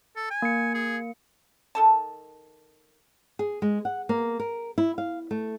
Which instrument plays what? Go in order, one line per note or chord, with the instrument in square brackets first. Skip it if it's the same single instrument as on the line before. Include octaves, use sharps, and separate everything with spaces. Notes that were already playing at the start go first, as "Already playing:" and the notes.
[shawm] A4
G#5
[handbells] A#3 C#7
[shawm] G#4
[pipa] D#3 A4 A5
[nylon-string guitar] G#4
G#3
F#5
A#3
A#4
E4
F5
A3